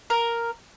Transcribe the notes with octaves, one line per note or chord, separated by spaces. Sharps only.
A#4